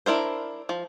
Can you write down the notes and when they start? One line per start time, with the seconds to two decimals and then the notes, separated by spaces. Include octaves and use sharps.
0.06 D4 E4 A#4 C5
0.69 F3